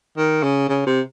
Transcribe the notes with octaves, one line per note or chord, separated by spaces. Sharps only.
D#3
C#3
C#3
C3